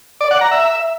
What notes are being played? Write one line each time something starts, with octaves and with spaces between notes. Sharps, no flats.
D5
F#5
A#5
E5